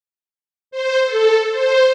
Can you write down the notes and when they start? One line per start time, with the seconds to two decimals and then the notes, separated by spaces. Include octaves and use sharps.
0.71 C5
1.05 A4
1.51 C5